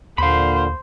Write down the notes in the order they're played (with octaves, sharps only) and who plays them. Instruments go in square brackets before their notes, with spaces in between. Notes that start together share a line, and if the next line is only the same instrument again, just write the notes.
[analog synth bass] D#2 [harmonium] A#2 D3 [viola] C5 [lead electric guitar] F5 B5